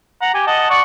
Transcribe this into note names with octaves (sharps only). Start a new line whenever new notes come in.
F#5 A#5
G4 G#5
D#5 F#5 A5
D5 F#5 C#6